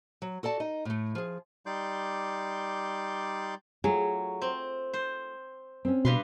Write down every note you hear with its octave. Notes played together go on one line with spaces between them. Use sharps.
F#3
F#4 A4 D5 A5
D#4 D#5
A2 A3
F3 G#4
G3 D#4 D5 C6 D6 G6
F#3 A3 F4 G#4
C4
C5
C4 C#4
G2 B2 B4 C6